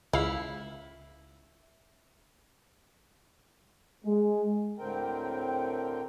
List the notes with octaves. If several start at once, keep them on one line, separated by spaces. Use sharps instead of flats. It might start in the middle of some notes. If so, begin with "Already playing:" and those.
C#2 E4 F5
G#3
D2 A2 D3 C4 A#4 G5